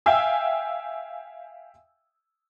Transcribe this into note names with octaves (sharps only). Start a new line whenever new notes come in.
E5 F5 G5 G#5 E6